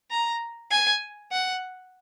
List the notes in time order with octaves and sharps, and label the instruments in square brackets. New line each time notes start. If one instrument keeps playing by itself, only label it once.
[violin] A#5
G#5
F#5